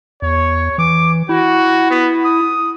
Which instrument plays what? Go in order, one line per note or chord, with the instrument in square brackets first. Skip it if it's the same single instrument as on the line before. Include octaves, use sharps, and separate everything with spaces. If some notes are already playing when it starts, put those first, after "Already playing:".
[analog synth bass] E2 [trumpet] C#5
[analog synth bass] E3 [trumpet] D6
[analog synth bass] E4 [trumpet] F#4
[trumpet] B3
D#6